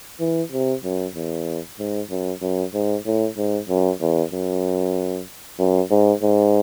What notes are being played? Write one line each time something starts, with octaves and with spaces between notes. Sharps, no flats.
E3
C3
F#2
E2
G#2
F#2
F#2
G#2
A2
G#2
F#2
E2
F#2
F#2
G#2
G#2